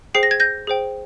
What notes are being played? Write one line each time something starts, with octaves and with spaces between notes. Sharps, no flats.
G#4 C5 G5 C7
A#6
G#6
G6 A#6
G#4 C5 G5